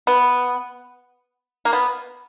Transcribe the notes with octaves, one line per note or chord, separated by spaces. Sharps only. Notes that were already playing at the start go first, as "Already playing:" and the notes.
B3
A#3
B3